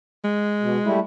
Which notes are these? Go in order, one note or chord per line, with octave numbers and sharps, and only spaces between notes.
G#3
B2
G3 A3 E4